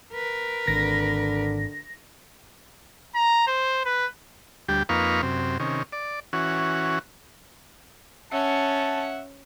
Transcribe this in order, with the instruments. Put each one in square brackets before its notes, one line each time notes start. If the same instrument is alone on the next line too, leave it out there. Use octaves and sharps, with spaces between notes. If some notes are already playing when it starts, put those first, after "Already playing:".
[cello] A#4 B4
[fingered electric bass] G#1 [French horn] D3 [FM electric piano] A#6
[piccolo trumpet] A#5
C5
B4
[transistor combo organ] D2 G3 G4
F2 A#3 D#4 B4 F5 C#6
F#2 C3 C4
C3 D#3 C#4
D5
E3 C#4 F#4
[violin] C#4 [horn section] E5 F#5 [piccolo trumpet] A5